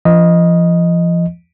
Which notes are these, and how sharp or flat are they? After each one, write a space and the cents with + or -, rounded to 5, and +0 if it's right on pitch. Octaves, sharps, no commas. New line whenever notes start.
F3 -35 D#5 +0